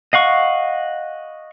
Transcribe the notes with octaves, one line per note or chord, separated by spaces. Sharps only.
D#5 F5 F#5 C#6